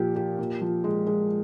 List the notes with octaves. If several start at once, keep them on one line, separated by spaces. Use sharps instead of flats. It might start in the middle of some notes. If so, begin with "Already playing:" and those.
Already playing: A#2 F3 G4
G4
A#2
F3
G#3
G#3